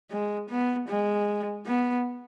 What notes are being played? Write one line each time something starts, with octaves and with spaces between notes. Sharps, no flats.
G#3
B3
G#3
B3